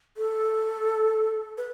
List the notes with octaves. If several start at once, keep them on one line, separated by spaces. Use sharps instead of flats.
A4
B4